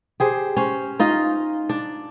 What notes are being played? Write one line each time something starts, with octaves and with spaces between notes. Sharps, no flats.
G4 G#4 C5
C#4 C5
D#4 F4 D#5
D4